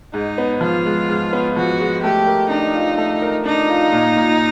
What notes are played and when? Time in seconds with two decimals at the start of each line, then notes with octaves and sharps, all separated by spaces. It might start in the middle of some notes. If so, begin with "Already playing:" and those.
0.14 G#2 D#4
0.38 B3
0.61 F3 F4
0.85 G#3
1.08 G#2
1.33 B3
1.56 F3 F#4
1.80 G#3
2.03 A3 G4
2.27 A#4
2.50 D4 D#4
2.75 F4
2.98 A3
3.22 A#4
3.45 D4 D#4
3.70 F4
3.92 A#2
4.17 A#2